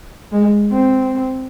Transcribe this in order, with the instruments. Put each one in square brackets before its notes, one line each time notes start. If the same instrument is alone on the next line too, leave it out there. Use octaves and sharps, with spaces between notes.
[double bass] G#3
C4